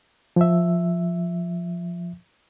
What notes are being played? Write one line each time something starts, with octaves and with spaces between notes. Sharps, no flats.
F3 E5